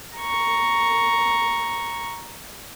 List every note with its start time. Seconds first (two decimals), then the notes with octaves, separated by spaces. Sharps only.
0.18 A#5 C#6